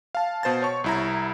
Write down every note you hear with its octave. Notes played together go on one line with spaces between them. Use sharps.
F5 A5
B2 C5 A5 A6
C#5 C#6
C2 E4 A#5